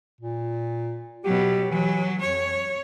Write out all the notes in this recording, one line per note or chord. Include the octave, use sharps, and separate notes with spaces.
A#2
B2 F#3 G4
E3 F#3
F2 C#5